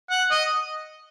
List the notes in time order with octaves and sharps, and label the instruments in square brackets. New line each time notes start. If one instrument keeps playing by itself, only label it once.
[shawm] F#5
D#5